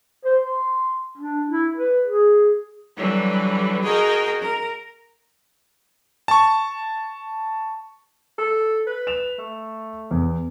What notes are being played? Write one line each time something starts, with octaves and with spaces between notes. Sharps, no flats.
C5
C6
D4
E4
B4
G#4
D3 E3 F#3 G3 B3
F#4 G#4 A#4 D#5 G5
A#4
A5 C#6
A4
B4
E7 F7
A3
E2